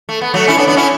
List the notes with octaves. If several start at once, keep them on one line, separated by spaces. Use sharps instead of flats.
A3
B3
F#3 A3
C#4 E4
B3 D4
B3 D4
C#4 E4